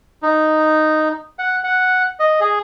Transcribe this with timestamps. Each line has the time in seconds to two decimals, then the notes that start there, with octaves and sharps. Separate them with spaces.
0.23 D#4
1.39 F#5
1.64 F#5
2.20 D#5
2.40 G#4